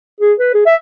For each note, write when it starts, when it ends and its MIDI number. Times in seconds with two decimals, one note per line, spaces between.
0.20 0.33 68
0.40 0.53 71
0.54 0.63 68
0.66 0.75 76